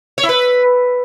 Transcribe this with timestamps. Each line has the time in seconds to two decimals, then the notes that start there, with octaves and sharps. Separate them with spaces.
0.18 C#5
0.23 E4
0.29 B4